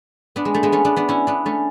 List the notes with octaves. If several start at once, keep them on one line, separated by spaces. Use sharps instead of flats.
B3 D4
G#3
A3
G#3 B3
A3 C#4
B3 D4
B3 D4
C#4 E4
B3 D4
A3 C#4